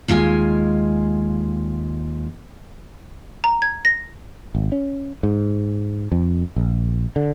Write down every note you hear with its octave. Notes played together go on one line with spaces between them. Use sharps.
D#2 G#3 F4 E5 G#5
A#5
G#6
A#6
G#1
C#4
G#2
F2
A#1
D3